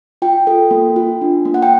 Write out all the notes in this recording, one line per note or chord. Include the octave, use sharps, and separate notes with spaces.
F4 G5
A4
A#3
F4
D4
A#3
F#5
G5